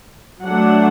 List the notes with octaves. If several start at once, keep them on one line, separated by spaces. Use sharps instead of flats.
F#3 A3 D4 F#5